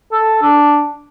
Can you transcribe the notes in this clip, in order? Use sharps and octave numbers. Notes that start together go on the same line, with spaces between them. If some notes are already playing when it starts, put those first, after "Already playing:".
A4
D4